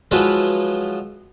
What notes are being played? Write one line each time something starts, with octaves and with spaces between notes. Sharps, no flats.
F3 F#3 G#3 E4 F4 B4